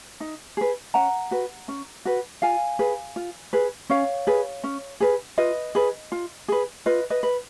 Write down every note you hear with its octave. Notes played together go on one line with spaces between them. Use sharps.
D#4
G#4 B4
C#4 F#5 A#5
F#4 B4
C#4
F#4 B4
F4 F5 G#5
G#4 B4
F4
G#4 B4
C#4 C#5 F5
G#4 B4
C#4
G#4 B4
F4 B4 D#5
G#4 B4
F4
G#4 B4
F4 B4 D#5
B4 D#5
B4